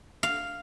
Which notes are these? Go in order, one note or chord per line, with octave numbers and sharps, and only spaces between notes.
F5